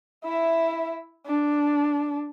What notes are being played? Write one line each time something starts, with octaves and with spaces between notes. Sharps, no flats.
E4 E5
D4